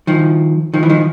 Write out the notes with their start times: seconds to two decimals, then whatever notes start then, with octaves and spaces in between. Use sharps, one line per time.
0.07 D#3 F3
0.74 D#3 F3
0.83 E3
0.90 D#3 F3